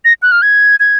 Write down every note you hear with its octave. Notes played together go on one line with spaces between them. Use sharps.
A#6
F#6
F6
G#6
G#6